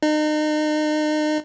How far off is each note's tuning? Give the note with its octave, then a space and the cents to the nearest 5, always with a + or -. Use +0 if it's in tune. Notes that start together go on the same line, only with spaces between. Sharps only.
D#4 -35